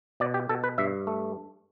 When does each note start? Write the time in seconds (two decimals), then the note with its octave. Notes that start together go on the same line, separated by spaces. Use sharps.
0.20 B2 D5
0.34 G4
0.49 B2 A4
0.64 B4
0.78 G2 E5
1.07 A3